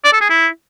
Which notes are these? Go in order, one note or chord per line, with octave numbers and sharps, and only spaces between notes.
D5
A4
G#4
E4